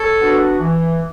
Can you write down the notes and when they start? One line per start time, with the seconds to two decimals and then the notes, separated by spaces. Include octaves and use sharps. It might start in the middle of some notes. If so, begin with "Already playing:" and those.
Already playing: A4 C#5
0.20 B3 D4 F#4
0.59 E3